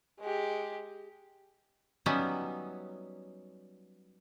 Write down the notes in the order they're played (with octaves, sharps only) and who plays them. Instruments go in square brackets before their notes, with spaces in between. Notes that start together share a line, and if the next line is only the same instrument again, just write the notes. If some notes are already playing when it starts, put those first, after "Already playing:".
[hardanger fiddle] G#3 G4
[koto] F#3 G3 B3 C#4 D#4 E5